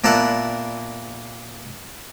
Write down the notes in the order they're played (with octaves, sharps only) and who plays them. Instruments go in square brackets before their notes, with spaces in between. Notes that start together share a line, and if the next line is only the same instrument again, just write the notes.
[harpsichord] A#2 A#3 B3 D4 E4 F#5